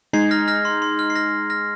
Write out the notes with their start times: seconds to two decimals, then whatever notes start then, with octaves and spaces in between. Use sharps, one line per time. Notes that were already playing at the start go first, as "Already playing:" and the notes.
0.13 G#3 D#4 G#4 G#6 C7
0.31 F6 A#6
0.48 F6 A#6
0.65 C6
0.82 C6
0.99 F6
1.10 C7
1.15 F6 A#6
1.50 F6 A#6